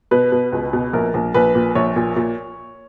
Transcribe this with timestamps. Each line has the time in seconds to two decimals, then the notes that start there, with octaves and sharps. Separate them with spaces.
0.11 B2 B4
0.32 B2
0.52 C#2
0.73 B2
0.93 A#1 A#4
1.14 A#1
1.34 A#1 B4
1.55 A#2
1.75 A#1 C#5
1.96 A#2
2.16 A#2